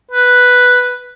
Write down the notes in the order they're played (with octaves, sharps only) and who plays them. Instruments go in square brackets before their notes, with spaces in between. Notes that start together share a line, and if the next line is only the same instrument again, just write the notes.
[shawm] B4